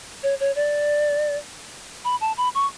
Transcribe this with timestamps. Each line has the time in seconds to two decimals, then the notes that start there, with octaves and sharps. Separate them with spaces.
0.23 C#5
0.40 C#5
0.56 D5
2.04 B5
2.21 A5
2.37 B5
2.55 C#6